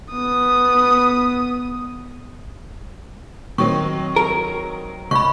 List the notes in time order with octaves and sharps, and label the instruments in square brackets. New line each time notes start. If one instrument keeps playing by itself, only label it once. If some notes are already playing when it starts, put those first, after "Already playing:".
[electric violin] B3 D#6
[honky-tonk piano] D#3 F#3 C4 [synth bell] C#6
[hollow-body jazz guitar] A#4
[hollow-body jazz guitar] C#2 [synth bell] B5 C#6